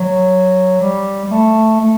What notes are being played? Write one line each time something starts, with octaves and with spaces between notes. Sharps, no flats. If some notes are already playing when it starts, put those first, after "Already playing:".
Already playing: F#3
G3
G3
A3
A3